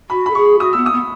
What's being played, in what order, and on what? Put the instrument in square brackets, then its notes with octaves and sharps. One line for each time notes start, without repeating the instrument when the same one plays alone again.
[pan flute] F#4 [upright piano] B5
[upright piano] B5
[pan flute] A4
[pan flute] G#4 [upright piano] C#6
[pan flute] F#4 [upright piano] D#6
[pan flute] B3 [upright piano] E6
[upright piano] D#6
[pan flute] B3